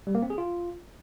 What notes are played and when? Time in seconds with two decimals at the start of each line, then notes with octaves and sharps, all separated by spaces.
0.07 G3
0.15 A#3
0.22 C4
0.30 G#4
0.38 F4